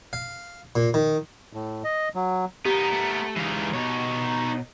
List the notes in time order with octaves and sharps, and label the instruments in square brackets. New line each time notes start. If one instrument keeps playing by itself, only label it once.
[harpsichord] F5
A#2
D#3
[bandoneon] A2
D#5
F#3
[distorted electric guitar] B3 A#4 [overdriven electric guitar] D#4 [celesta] G4
[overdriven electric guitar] A3
[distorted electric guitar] E3 D#4 [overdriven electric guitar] G#3 F5
[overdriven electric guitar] B2 [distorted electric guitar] D#4 C#5